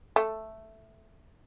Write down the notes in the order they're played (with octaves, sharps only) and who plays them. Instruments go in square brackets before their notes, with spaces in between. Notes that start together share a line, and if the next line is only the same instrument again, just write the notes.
[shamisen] A3